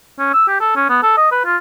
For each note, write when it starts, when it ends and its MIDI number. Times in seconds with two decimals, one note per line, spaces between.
0.19 0.28 61
0.34 0.46 88
0.48 0.57 67
0.61 0.72 69
0.76 0.89 61
0.89 1.01 59
1.03 1.15 69
1.17 1.31 75
1.32 1.43 71
1.45 1.57 65